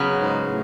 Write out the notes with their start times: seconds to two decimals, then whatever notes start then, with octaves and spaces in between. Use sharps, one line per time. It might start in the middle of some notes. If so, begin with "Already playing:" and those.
Already playing: C#3 F#3 B3
0.18 G#2
0.46 A2